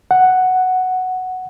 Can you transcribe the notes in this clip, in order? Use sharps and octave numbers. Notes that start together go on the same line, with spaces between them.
F#5